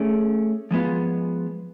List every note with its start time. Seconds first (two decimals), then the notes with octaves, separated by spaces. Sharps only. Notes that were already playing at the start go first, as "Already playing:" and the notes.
Already playing: A3 C#4 G#4 D5
0.71 F3 G#3 B3 F4